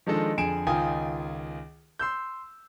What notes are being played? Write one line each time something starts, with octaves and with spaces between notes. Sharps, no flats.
D#3 F3 G#3 D4 A4 D#5
F2 D3 G#4 G#5 D7 E7
C#2 D#3 F4 G5 G#5 D#6
C6 E6 G6